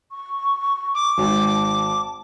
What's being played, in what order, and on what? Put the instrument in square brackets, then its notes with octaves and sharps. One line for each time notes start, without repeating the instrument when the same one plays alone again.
[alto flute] C#6
[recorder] D6
[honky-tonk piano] G#1 [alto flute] A5